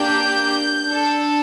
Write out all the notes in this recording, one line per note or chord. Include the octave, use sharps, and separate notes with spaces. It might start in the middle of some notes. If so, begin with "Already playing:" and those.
Already playing: A#3 D4 G4 G6
D4
A4